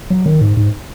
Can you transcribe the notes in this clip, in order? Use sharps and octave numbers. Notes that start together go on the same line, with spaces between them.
F#3
D#3
G#2
G#2